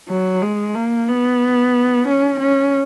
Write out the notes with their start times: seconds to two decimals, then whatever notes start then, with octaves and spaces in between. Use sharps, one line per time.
0.09 F#3
0.42 G#3
0.75 A#3
1.08 B3
2.08 C#4
2.40 C#4